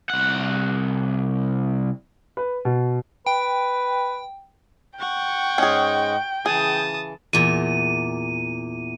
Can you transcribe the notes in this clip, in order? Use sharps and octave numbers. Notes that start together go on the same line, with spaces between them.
C2 F#5
B4
B2
B4 G5
F#5 G5 C#6
G#2 G#3 C#4 G#4 D#5
C#3 E3 G#4 A5 D#6
E2 A#2 D#7